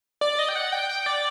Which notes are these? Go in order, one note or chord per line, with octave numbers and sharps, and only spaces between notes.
D5
D#5
G5
F#5
G5
G5
D5